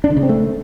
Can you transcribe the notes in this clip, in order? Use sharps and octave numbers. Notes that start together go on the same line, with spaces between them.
D4
D3
C#3
C4
A3